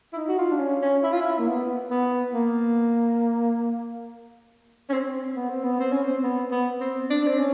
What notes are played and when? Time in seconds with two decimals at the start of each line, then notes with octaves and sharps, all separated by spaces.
0.13 E4
0.16 D#4
0.28 F#4
0.38 F4
0.51 D4
0.60 C#4
0.82 C#4
1.04 E4
1.12 F4
1.21 E4
1.39 A#3
1.47 B3
1.91 B3
2.34 A#3
4.90 C#4
4.93 C4
5.36 B3
5.49 C4
5.63 B3
5.80 C4
5.92 C#4
6.04 C4
6.23 B3
6.51 B3
6.81 C4
7.10 D4
7.27 C4
7.38 C#4